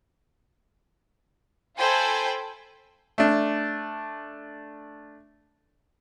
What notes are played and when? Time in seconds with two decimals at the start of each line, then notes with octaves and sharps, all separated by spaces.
1.77 F4 A4 C5 G5 G#5 B5
3.18 A3 D4